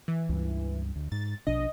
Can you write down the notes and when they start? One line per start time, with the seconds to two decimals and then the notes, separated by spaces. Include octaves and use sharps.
0.08 E3
0.29 C#2 G2
0.96 D2
1.12 G#2 A6
1.47 A#1 B2 D4 D#5